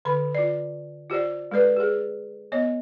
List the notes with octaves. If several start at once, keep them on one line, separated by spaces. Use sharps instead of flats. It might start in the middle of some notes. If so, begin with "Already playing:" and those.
D3 A4 B5
F4 D5
F4 G4 C5 D5
G#3 A4 B4 D5
G4 G#4
B3 C#5 D#5